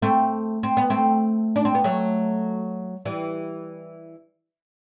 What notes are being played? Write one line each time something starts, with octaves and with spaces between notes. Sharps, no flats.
A3 C4
C4
B3
A3 C4
D4
C4
B3
F#3 A3
E3 G3